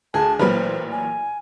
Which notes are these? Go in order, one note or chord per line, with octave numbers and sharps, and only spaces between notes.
D2 G#4 A5
A1 A#2 F#3 B4 C5 B5 F6
G#5